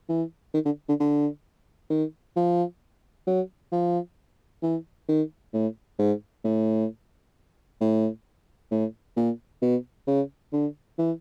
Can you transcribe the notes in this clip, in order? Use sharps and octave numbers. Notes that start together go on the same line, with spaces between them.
E3
D#3
D3
D3
D3
D#3
F3
F#3
F3
E3
D#3
A2
G#2
A2
A2
A2
A#2
B2
C#3
D3
E3